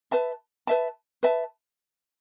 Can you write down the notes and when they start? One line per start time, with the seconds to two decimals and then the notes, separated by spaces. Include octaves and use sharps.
0.11 B4 E5 A5
0.67 B4 E5 A5
1.23 B4 E5 A5